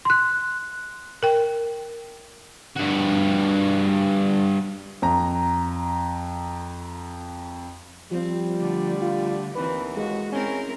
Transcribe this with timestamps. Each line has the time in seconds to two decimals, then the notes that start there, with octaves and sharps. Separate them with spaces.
0.05 C6 F#6
1.23 A#4 G5
2.76 G2 F#4
5.02 F2 A#5
8.11 F3 G3 C4
8.59 D3 A3 D5
9.01 F4
9.55 D#2 E3 C4 B4
9.96 G#3 F#4
10.32 C4 C#4 E4 A#4